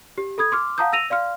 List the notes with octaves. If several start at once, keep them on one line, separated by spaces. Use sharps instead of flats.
G4
A4 B5 D#6 G#6
C6 D6 F6
F5 F#5 A5 A#5 D#6 G6
E6 A#6 D#7 F7
D5 F5 C6 F6